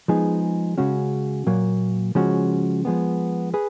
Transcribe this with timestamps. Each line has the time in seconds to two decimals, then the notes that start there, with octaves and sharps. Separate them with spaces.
0.08 F3 G#3 B3 D#4 G#4
0.78 C#3 G#3 C#4 F#4
1.47 A#2 F#3 A#3
2.15 C#3 F3 G#3 C#4 F#4
2.85 F3 G#3 B3
3.54 G#4 B4